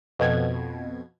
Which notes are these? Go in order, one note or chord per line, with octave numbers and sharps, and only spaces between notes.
F2 B2 G#6